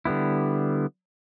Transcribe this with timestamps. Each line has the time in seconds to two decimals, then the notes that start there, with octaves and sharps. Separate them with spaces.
0.05 D3 G3 B3 E4